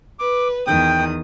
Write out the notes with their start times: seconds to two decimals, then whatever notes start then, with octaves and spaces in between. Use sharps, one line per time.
0.19 B4 D6
0.67 E2 D#3 G5 D#6